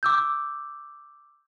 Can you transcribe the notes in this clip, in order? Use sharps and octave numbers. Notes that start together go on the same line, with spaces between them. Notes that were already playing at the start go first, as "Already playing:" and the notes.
D6 E6 G6